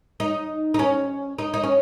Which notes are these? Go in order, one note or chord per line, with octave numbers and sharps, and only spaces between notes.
D#4
D#4
C#4
D#4
D#4
C#4